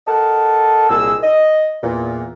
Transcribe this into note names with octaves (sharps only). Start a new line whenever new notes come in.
A4 A#4 D#5 F#5 A5
C2 A#2 G3 G#3 G#4 E6
D#5
E2 A#2